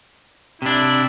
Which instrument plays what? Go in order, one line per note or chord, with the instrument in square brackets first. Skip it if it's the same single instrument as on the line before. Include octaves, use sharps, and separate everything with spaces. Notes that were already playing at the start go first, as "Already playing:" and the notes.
[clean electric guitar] C3 D4 [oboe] E4